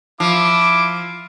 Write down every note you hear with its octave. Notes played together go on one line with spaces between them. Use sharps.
F3 E4 D6